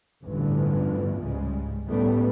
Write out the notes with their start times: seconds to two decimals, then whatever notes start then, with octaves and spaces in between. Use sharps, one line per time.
0.24 A1 E2 G2 D3 E3 F3
1.17 C#2 G#2 C#3 G3 G#3
1.87 A2 C#3 G3 A3 B3